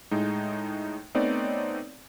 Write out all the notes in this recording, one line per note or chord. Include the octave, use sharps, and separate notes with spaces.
A2 G#3 D#4
A3 B3 C4 D#4 C#5 D5